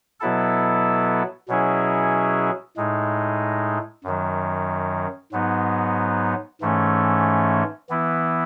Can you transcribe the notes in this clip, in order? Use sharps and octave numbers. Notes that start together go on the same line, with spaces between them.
B2 F#3 B3 E4 A4
B2 F#3 C#4 E4 G#4
A2 G#3 D#4
F#2 D#3 F#3
G#2 F#3 B3 D#4
G#2 E3 A3 C#4
E3 B3 E4